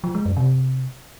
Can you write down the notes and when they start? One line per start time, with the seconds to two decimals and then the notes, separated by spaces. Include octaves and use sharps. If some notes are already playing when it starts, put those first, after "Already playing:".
0.04 F3
0.15 G#3
0.26 F#2
0.37 C3